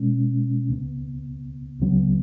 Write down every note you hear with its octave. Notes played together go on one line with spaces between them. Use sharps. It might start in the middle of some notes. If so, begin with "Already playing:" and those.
Already playing: B2 G#3 C#4
C#2 C#3 B3
C#2 C#3 F#3 B3